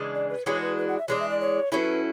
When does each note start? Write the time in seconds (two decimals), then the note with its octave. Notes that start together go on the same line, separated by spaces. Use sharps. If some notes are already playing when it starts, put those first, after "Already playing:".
Already playing: C#3 E3 G#3 D4
0.15 D5
0.30 B4
0.46 E3 G#3 D4 F#4 C#5
0.61 B4
0.78 B4
0.88 F#5
0.98 E5
1.08 E3 G#3 D4 C#5
1.19 E5
1.29 D5
1.41 C#5
1.72 F#3 C#4 E4 A4 B4 C#5